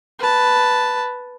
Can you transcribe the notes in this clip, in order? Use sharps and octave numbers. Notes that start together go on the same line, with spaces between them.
B4 A5